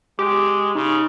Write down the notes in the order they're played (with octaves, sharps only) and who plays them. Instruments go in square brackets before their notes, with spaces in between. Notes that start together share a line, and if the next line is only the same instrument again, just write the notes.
[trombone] G#3 [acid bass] G4 [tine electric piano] D6
[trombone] C#3 [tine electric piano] D#4